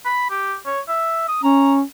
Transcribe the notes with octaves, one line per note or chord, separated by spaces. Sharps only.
B5
G4
C#5
E5
D#6
C#4 A#5